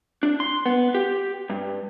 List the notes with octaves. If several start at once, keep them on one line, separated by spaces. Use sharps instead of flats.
D4
C6
B3
G4
G2